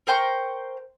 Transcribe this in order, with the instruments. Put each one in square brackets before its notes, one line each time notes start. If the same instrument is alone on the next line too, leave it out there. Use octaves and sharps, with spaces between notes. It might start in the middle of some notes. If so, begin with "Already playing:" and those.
[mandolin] A#4 C5 G5 C#6